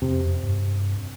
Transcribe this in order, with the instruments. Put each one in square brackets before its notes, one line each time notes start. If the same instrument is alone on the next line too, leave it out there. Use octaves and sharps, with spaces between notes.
[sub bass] F2 [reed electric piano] C3
[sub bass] G2